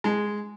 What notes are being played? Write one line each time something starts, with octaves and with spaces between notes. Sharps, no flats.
G#3